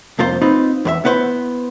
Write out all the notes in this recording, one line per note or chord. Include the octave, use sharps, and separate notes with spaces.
C2 F2 A#3 F4 C5
C4 D#4 F4 B4
E2 B4 E5
B3 E4 B4 C5